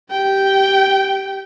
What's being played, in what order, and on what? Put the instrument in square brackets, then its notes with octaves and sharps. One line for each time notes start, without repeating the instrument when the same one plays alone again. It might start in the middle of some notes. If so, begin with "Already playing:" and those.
[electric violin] G4 G5